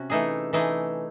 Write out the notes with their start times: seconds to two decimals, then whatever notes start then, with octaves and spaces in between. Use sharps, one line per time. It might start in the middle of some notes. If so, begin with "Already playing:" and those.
Already playing: C3 C#4 F#4
0.10 E3 A3 D#4 G#4
0.53 E3 A3 D#4 G#4